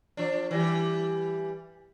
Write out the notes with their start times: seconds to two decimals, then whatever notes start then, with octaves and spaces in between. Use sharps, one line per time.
0.17 F3 D4
0.51 E3 G3